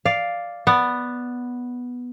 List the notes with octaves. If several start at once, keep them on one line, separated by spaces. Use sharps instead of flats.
D5 F5
B3 D5 F#5